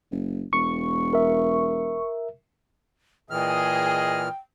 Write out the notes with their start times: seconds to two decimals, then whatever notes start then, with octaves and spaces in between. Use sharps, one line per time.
0.11 F#1
0.53 E1 C#6
1.13 A#4 E5
3.30 A#2 E3 G#4 D#5 G5 F6